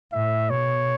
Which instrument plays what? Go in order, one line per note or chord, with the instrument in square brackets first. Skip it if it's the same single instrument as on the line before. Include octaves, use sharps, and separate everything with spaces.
[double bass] A2 [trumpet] E5
[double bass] B2 [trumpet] C#5